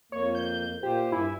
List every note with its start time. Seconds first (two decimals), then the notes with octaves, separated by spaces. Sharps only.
0.12 F2 A#3 C#5
0.35 G6
0.83 A#2 F4 G4 C5
1.12 G2 E4 G#5